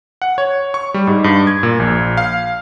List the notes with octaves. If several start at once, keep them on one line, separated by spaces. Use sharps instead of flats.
F#5
C#5
C#6
G3
G#2
G2
G#6
A#2
A#1
F5